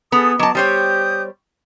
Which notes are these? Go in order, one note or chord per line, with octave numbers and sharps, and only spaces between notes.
B3 G#4 A4 D#6
F#3 D#5 A5 D6
G3 G4 C5 C#5 D#6 G6